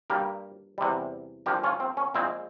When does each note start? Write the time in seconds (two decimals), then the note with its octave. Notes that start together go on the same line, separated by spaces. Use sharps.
0.10 G2 G3 A#3 G4 A#4
0.78 E2 C3 G3
1.46 G2 F3 A#3 G4 A#4
1.64 C#4 F4
1.80 C4
1.97 C#4
2.14 A#1 A#2 G#3 C4 E4